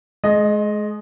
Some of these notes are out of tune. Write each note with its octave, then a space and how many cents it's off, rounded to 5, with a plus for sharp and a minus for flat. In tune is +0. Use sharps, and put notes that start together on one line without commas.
G#3 +30 D#5 -5